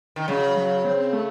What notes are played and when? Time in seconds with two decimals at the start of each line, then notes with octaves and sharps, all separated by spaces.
0.16 D#3
0.28 C#3 F#3
0.57 F#3
0.85 C4
1.13 A3